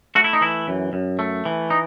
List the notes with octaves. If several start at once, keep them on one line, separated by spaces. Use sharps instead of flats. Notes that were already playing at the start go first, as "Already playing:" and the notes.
A3 F#4
E4
D#4
E3 E4
F#2
F#2
A3
E3
D#4